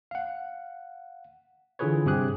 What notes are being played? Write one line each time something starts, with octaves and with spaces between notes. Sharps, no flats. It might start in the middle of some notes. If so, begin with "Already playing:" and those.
F5 F#5
D3 E3 F4 G#4 B4 C#5
G2 C3 C4 G4 G#4 F#6